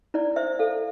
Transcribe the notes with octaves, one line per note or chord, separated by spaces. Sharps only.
E4 D5
C5 E5
A4 F5